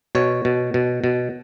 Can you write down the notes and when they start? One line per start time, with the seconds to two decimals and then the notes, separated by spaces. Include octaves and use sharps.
0.15 B2 C#5
0.45 B2
0.74 B2
1.04 B2